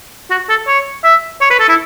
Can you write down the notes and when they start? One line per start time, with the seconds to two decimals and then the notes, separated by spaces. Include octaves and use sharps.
0.30 F#4
0.49 A4
0.67 C#5
1.04 E5
1.41 C#5
1.50 B4
1.60 A4
1.69 E4